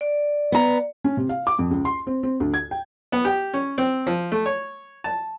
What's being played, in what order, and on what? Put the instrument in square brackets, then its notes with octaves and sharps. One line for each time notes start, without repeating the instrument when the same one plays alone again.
[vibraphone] D5
[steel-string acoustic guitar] B3 A#5
[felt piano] C#4
C3
F5
D6
F2
C#2
C6
C4
C4
D2
G#6
G5
[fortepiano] B3
G4
C#4
C4
F3
A3
C#5
A5